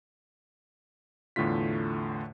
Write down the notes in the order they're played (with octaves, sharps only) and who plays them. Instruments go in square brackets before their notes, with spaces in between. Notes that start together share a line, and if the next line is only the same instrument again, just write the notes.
[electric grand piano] E2 A2 D3 A3 F4 B6